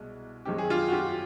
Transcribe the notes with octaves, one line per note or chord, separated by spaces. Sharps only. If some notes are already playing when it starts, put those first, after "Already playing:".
Already playing: C2 B2 G#3
F#2 D#3 G#3 C4 G4
G#4
F4 G4
F#4
F4 G4